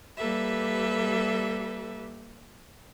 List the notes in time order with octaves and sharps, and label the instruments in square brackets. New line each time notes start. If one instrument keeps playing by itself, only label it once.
[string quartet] G3 A#3 G4 A4 B4 E5